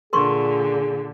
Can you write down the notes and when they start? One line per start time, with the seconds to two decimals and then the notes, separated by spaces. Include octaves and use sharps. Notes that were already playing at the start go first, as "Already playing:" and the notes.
0.13 A#2 D3 G#4 A#4 C6 C#6